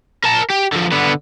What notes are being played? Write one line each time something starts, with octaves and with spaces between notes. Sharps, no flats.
A#4 A5
G4
D3 F3
D3 B3